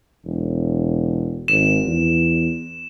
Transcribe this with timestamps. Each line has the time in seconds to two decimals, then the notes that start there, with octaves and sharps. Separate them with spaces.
0.24 E1
1.48 G#1 E7
1.86 E2